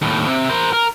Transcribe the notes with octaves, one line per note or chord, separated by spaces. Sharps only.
D#2 A2
C3
A#4 C5
A#4